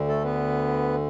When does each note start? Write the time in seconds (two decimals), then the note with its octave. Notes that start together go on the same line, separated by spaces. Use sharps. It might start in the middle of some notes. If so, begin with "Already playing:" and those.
Already playing: D2 D3
0.08 A3 A4
0.23 B3 B4